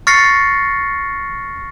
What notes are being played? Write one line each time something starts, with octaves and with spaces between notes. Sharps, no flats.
C#6 F6 A6 A#6 C7 C#7